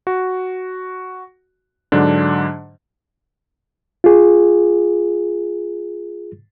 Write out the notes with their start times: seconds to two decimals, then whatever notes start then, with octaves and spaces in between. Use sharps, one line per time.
0.07 F#4
1.92 G#2 D3 F#3 D4
4.04 F4 G#4